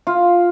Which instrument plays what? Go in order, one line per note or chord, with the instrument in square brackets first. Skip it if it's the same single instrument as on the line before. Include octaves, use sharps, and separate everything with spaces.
[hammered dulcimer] F4